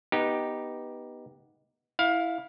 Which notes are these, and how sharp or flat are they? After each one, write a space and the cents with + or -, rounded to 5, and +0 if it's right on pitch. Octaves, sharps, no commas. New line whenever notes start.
B3 -10 D#4 +0 G4 +0
E4 +0 F5 +20